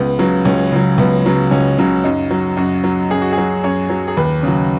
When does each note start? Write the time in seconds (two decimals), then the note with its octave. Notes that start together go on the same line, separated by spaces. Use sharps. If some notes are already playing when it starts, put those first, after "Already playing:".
Already playing: C#2 B3
0.19 C#3 F#3
0.45 C#2 C#4
0.72 C#3 F#3
0.98 C#2 B3
1.26 C#3 F#3
1.51 C#2 C#4
1.79 C#3 F#3
2.04 F#2 D#4
2.31 F#3
2.57 F#2 F#4
2.84 F#3
3.10 F#2 G#4
3.22 F#4
3.32 G#4
3.38 F#3
3.63 F#2 C#5
3.89 F#3
4.08 G#4
4.17 D#2 B4
4.43 C#3 F#3